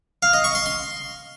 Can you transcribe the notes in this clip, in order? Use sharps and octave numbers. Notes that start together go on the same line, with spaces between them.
F5
D#5
C#6
C6
C6